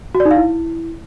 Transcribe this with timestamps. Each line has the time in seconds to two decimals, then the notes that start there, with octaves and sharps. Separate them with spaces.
0.15 F#4
0.20 D5
0.25 D#4
0.31 F5
0.36 E4